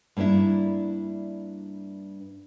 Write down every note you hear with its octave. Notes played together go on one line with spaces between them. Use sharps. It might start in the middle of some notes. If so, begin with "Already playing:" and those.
G2 A#3 C#4 D4 E4